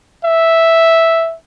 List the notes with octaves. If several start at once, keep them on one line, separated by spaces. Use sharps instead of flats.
E5